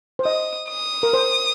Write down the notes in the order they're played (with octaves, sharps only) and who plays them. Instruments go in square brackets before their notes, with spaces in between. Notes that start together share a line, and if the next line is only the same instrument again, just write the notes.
[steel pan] C5
[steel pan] D#5 [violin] D#6
[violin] D#6
[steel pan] A#4
C5